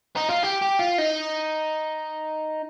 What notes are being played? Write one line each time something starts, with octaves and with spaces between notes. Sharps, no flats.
D#4
F4
G4
G4
F4
D#4